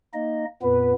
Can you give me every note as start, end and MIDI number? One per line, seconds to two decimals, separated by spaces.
0.14 0.45 58
0.14 0.45 63
0.14 0.45 75
0.62 0.93 41
0.62 0.93 46
0.62 0.93 59
0.62 0.92 71